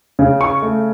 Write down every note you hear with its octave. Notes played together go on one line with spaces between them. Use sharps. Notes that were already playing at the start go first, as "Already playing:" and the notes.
C#3
C#6
A3